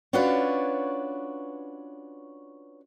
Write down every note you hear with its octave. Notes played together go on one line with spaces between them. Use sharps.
C#4 D4 F4 F#4 B4 C#5